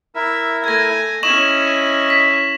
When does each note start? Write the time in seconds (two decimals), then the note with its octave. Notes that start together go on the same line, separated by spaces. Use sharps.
0.15 E4 A#4 E5
0.64 A3 G#5 G#6 A#6
1.23 C#4 E4 D#5 C#6 E7 F#7
2.10 B6